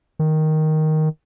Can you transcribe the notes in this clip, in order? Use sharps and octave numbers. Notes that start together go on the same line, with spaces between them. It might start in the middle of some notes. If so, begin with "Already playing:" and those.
D#3